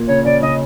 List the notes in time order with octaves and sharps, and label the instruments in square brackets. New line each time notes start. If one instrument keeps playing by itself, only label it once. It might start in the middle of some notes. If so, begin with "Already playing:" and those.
Already playing: [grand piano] A#2
[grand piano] C#3 [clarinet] C#5
[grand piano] C#3 [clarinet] D5
[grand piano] C#3 [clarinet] D#5